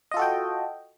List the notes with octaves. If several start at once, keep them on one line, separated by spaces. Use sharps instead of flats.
F4 F#4 A4 D#5 G5